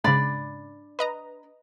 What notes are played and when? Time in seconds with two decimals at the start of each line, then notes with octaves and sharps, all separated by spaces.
0.04 G#2 C#3 D4 D5 B5
0.99 B4 D#5 A#5